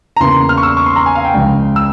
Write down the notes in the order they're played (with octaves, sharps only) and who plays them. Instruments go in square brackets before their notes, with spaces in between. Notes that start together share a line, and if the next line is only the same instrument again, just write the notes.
[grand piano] A#5
E2 C#3 E3 A#3 C6
F6
C#6
E6
C#6
C6
A#5
G#5
F5
G5
C#2 C#3 F3
E6